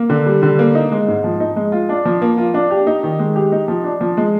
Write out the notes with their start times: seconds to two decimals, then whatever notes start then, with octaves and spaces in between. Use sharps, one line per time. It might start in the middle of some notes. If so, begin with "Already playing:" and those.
Already playing: A#3
0.10 D3
0.26 G3
0.43 D3
0.59 A#3
0.75 D#4
0.92 G#3
1.08 G#2
1.24 F3
1.40 D#4
1.56 G#3
1.72 F4
1.89 D4
2.05 F3
2.22 A#3
2.38 F4
2.54 D4
2.71 G4
2.87 D#4
3.03 D#3
3.19 G#3
3.36 G4
3.52 D#4
3.68 F3
3.84 D4
4.01 F3
4.17 G#3